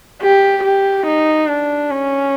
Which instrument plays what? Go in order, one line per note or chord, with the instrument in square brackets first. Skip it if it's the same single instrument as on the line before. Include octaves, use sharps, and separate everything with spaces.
[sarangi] G4
G4
D#4
D4
C#4